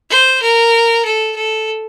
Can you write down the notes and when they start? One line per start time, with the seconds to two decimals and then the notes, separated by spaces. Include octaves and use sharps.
0.10 C5
0.42 A#4
1.05 A4
1.36 A4